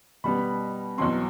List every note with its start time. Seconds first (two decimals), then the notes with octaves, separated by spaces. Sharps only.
0.24 B2 G3 B3 B5
0.98 E2 B2 F#3 C4 C6